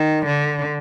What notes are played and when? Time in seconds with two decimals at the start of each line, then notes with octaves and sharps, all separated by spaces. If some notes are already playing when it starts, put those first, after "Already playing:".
Already playing: D#3
0.26 D3